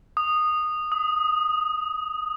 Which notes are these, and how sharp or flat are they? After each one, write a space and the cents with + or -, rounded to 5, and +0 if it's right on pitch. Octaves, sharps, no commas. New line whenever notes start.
D#6 -15
D#6 +20